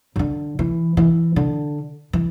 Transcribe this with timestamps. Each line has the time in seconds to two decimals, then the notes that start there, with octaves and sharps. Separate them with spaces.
0.16 C#3
0.19 D3
0.59 E3
0.97 E3
1.36 D3
2.13 E3